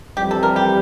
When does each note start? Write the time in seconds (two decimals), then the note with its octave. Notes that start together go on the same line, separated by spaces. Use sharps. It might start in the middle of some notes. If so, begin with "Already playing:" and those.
0.17 F2 E3 G3 G4
0.31 A4
0.43 A#4
0.56 G4